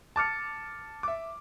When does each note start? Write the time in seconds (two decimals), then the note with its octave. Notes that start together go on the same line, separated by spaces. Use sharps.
0.16 A5 D6 F6 A6 C#7
1.03 E5 D6